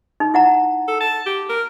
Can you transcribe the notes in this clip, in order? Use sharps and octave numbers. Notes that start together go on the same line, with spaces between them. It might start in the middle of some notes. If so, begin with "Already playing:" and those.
D#4
E4 F#5 A#5
A4
A5
G4
A#4